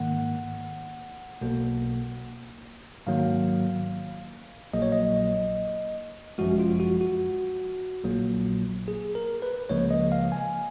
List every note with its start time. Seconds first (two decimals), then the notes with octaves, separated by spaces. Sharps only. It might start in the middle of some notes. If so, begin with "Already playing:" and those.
Already playing: G#2 D#3 A#3 F#5
1.41 B1 B2 A#3
3.07 G#2 D#3 F#3 A#3 F5
4.73 A#1 A#2 F#3 A#3 D#5
4.82 C#5
4.92 D#5
6.38 G#1 F#2 F3 G#3 F#4
6.59 F4
6.80 F#4
7.01 F#4
8.04 A#1 A#2 F#3 A#3
8.88 G#4
9.15 A#4
9.42 B4
9.69 C#2 C#3 F3 A#3 C#5
9.91 D#5
10.12 F5
10.32 G#5